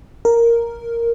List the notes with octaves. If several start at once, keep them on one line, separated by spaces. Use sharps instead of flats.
A#4